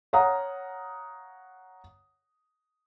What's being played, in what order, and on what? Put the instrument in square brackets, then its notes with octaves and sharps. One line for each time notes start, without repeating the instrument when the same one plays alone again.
[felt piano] C#5 F5 F#5 A#5 D#6